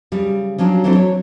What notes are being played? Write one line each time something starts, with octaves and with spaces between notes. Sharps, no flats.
C#3 G3
F3 F#3 C#4 D4
E3 F#3 A3 C4 D4 E4
C#5